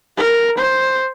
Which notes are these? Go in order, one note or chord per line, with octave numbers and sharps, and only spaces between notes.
A#4
C5